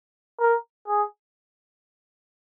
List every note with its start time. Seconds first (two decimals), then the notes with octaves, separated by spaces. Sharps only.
0.39 A#4
0.88 G#4